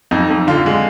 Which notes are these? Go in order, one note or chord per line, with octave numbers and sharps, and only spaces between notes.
F2 D#4
F2
D3 F4
G#3